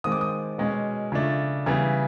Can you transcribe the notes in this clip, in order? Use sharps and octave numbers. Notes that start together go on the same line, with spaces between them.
D#3 G#3 C4 D#6
D6
D#6
B2 G#3 C#4
C#3 F3 A3 D4
C#3 E3 G3 B3